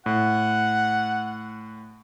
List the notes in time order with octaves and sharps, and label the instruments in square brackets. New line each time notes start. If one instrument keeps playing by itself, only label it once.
[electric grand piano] A2 [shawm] F#5